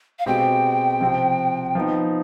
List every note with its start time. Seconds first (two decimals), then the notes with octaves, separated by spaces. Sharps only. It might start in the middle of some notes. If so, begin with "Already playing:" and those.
0.19 F5
0.26 B2 G#3 C4 G4 G5
1.00 C3 F3 C4
1.75 F3 B3 D#4